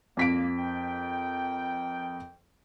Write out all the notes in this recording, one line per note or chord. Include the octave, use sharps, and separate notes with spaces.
C2 F2 A#3 B6 D7
A#4 D#5 G5